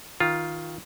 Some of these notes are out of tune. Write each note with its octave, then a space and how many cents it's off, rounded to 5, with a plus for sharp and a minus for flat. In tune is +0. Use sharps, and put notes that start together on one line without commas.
D#3 +15 F4 +0